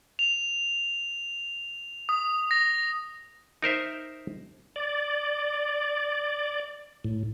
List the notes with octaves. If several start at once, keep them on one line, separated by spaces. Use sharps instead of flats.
F7
D#6
A#6
D#4 A#4 C5 E5
D5
A2